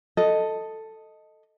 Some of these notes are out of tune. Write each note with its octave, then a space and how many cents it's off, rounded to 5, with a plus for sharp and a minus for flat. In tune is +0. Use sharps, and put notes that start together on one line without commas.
A4 +5 D#5 +5